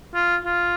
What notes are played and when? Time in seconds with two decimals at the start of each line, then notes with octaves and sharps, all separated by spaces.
0.15 F4
0.45 F4